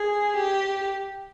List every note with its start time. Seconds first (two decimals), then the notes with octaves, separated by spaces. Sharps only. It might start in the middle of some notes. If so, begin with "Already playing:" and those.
Already playing: G#4
0.36 G4